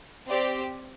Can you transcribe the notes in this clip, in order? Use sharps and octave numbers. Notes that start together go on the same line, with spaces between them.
C4 G4 D5